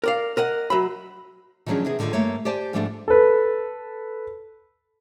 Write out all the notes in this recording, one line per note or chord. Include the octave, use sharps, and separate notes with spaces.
A#4 D5 F5
A#4 D#5 F#5
F#3 E5 B5
D#3 F3 F#3 C#4 D4 G#4
C3 D#3 B3 G#4
A2 D3 D#3 A3 F4
G2 A3 A#3 C#5
G4 C5 D5 G#5 A5
G#2 F3 G3 A3 D4 A4
A4 B4